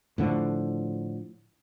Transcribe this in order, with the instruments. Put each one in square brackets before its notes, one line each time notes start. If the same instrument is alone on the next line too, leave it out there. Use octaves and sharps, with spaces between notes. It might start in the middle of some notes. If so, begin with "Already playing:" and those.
[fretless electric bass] A2 D3 F3